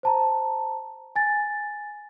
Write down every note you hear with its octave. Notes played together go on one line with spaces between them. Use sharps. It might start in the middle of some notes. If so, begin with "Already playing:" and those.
C5 A5 A#5
G#5 A6